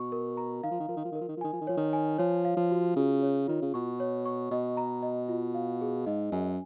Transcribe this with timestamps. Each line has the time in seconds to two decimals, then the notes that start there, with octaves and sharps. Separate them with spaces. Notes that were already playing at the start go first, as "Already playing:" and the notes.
Already playing: B2 C#6
0.12 A#4
0.37 A#5
0.63 D#3 F5
0.71 F3
0.80 D#3
0.88 F3 A#4
0.96 D#3
1.05 F3
1.12 D#3
1.15 A#4
1.21 F3
1.29 D#3
1.37 F3
1.41 D#3 G#5
1.53 F3
1.61 D#3
1.67 F3 C#5
1.77 D#3
1.93 G#5
2.18 F3 C#5
2.45 F5
2.57 F3
2.71 F#4
2.96 C#3 F4
3.22 C#5
3.47 D#3 F4
3.62 C#3
3.74 B2 C#6
4.00 C#5
4.26 C#6
4.51 B2 D#5
4.77 A#5
5.02 D#5
5.29 F4
5.55 F5
5.81 G#4
6.06 G#2 D#5
6.32 F#2 G#5